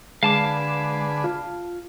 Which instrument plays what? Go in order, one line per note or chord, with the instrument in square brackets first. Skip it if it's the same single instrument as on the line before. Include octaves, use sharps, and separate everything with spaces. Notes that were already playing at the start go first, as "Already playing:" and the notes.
[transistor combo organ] D3 G#4 B4 [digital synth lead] G#3 [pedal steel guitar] F5 A5 D6
[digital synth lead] F4